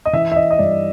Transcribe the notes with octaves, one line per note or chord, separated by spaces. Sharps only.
D#5
E3 E5
E5
D#5
D#5
G2 D5